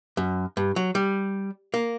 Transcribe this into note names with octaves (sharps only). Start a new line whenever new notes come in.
F#2
G2
F#3
G3
A#3